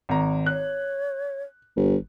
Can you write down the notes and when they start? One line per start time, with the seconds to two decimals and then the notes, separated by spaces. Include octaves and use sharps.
0.09 G#1 A#5
0.46 C#5 F#6
1.76 G1